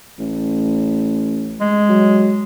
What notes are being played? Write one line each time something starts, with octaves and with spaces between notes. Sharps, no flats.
A1
G#3
F#3